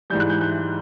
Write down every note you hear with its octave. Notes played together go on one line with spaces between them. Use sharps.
G#2 E3 G3 G6
F#6
G6
G6